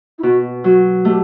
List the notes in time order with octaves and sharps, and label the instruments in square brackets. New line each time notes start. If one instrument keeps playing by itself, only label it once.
[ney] E4
[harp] B2 [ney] F#4
[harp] F#3 [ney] F#4
[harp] A3 [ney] G4